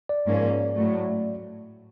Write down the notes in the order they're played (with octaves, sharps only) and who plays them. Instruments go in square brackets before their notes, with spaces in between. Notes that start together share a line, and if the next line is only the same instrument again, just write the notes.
[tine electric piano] D5
[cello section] G#2 F3 A#3 C#4
A2 F#3 A3